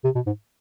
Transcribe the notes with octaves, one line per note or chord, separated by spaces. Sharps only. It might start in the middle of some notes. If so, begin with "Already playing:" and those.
C3
B2
G#2